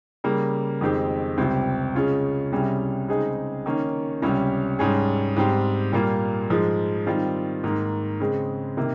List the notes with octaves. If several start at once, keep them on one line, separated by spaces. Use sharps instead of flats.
C#3 G3 A#3
F2 D#3 G#3 C4 G4
C#2 C3 G3 C4 G4
C#3 G#3 C#4 F4
C2 C3 G3 C#4 G#4
C#3 G#3 C4 D#4 G#4
D#3 A#3 C#4
C#2 C3 G3 C#4
G#2 G3 C#4 G#4
G#2 G3 C4 G4
A#2 G3 A#3 F4
G#2 F3 G#3
D#3 G3 C4 F4
G#2 D#3 A#3
C#3 G#3 C4
C3 D#3 A#3